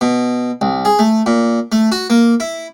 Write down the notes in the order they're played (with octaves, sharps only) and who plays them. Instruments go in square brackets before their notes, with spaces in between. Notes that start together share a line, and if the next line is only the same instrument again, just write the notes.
[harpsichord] B2
C2
G#4
A3
A#2
A3
F#4
A#3
E4